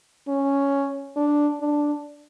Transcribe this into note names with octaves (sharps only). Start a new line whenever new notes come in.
C#4
D4
D4